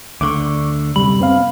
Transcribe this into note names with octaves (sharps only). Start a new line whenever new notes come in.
D2 D3 C#6 D6
F#2 C3 G3 B5
B3 C4 F5